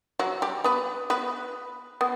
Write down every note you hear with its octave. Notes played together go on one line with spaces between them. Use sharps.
F#3 F#4
G3 G4
B3 B4
B3 B4
B3